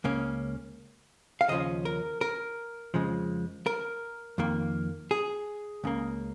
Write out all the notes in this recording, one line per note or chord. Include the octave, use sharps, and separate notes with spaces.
C#2 C#3 A#3 C#4
F5
D#2 C#3 F3 C#4 D#5
A#4
A#4
F2 C#3 F3 G#3
A#4
F2 D#3 A#3
G#4
C#2 C#3 A#3